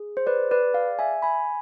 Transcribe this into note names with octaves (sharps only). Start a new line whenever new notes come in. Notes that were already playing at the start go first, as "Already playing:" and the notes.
Already playing: G#4
C5
B4 D5
B4 D5
D5 F5
E5 G#5
G#5 B5